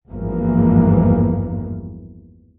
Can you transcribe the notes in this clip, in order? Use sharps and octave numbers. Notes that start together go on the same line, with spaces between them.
G#1 E2 G2 E3 F3 A#3